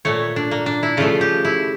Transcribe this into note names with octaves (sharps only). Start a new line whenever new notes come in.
A#2 A3 C#5
D4
A#3
D4
E4
C#3 F3 A3 F4
G4
E4